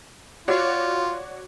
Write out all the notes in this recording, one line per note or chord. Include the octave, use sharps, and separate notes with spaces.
F4 F#4 C#5 D5